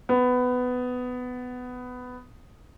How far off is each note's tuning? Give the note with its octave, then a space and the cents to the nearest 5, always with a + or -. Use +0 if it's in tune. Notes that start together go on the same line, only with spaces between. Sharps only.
B3 +15